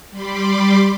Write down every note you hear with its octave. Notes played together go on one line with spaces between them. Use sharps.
G3 B5 C6 D6